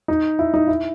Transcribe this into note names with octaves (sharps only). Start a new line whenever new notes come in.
D#4
E4
D#4
E4